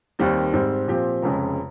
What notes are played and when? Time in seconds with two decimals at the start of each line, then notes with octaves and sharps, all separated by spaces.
0.19 D#2 D#3 G3 C4
0.53 G#2 G3 C4
0.88 A#2 F3 C4 G4
1.22 F1 F2 C#3 G#3